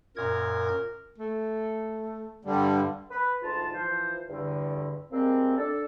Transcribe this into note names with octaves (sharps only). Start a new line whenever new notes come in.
F#2 A#2 A#4 G#6
A3
G2 D3 G3
B4
D2 G#2 F4 A5
E3 F3 C5
E2 G2 D3
F3 G3 G#3 A#3 C4
D4 A4